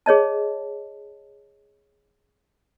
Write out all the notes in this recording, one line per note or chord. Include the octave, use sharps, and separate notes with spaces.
G#4 C#5 D#5 A5